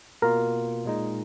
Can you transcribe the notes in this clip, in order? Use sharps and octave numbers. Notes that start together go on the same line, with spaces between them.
B2 A#3 F4 A#4
A#2 G#3 D#4